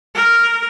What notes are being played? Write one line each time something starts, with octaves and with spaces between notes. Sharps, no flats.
A#4